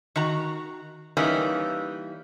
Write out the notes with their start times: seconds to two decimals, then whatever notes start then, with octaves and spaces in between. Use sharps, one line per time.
0.16 D#3 F#4 A#5
1.17 E3 G3 A#3 C#4 D#4